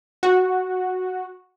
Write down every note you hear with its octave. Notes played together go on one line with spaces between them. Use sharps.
F#4